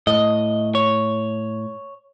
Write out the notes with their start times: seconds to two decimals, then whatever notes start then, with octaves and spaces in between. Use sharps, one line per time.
0.07 A2 D#5
0.75 C#5